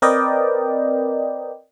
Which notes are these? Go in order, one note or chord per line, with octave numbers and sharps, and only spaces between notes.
C4 A#4 B4 D5 D#5 G5